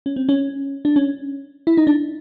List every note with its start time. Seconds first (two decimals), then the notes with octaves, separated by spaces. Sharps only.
0.06 C#4
0.16 C4
0.29 C#4
0.85 D4
0.96 C#4
1.67 E4
1.77 D#4
1.87 D4